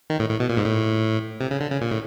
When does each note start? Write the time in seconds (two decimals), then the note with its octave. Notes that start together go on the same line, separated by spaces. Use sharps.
0.10 D#3
0.19 A2
0.30 A2
0.40 B2
0.50 A#2
0.57 G#2
0.65 A2
1.41 C3
1.51 C#3
1.60 D3
1.71 C#3
1.81 A#2
1.91 A2